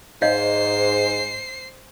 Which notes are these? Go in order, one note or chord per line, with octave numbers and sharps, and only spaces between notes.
G#2 C5 C#5 D#5 F5 C7